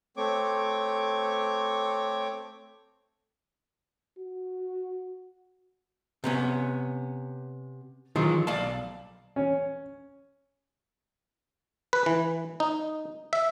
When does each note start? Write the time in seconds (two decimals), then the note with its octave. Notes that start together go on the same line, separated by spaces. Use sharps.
0.17 A3 C4 C#5 C#6 D6
4.19 F#4
6.24 C3 B3 C#4
8.16 D#3 E3 F#3 G#3 F4
8.47 B1 D5 F5 A5
9.36 C#4
11.93 B4
12.06 E3
12.60 D#4
13.33 E5